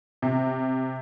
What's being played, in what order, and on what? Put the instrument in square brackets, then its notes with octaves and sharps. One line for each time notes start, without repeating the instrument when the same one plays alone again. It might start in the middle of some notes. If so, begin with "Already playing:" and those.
[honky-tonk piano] C3